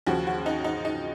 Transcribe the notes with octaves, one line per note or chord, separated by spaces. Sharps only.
D#2 C#3 F3 F#4
F#4
D#4
D#4
D#4